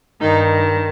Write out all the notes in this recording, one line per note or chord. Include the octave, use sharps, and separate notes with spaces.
G2 D#3 D#4